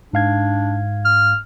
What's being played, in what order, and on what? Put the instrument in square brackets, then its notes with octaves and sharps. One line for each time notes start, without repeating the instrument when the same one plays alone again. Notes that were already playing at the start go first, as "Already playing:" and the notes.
[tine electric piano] G#2 F5 G#6 [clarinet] D4
[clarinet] F6